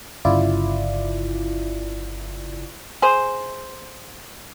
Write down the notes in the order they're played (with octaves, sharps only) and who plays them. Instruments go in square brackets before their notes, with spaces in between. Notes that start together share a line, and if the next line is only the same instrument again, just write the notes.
[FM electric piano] G1 C#3 E4 F4 D5
[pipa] G#4 C5